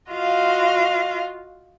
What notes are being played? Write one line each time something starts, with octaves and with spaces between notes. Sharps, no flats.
F4 F#4 D#5 F5